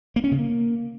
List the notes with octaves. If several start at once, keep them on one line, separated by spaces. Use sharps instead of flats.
A#3
C#4
C#3
A#3